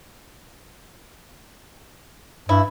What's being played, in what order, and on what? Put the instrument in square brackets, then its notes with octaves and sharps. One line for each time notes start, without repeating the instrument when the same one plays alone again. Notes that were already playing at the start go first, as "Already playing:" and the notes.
[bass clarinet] G2 [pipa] E4